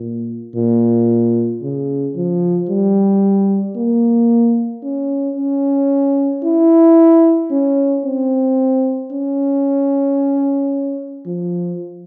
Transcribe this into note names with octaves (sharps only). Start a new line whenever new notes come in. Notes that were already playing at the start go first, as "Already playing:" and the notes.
Already playing: A#2
A#2
C#3
F3
G3
A#3
C#4
C#4
E4
C#4
C4
C#4
F3